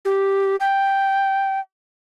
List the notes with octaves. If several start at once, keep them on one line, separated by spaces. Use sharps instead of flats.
G4
G5